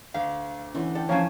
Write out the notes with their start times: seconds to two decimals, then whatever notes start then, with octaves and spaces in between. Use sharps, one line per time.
0.14 D2 F5
0.75 D3 E3 C#4
0.95 A4 D5 G5
1.09 F3 A#3 C#4 C#5 F5 G#5 A5 E7